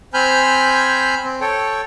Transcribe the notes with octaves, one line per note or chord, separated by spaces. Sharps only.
C4 C5 G#5 B5 F6 G6
C4
A4 C#5 G5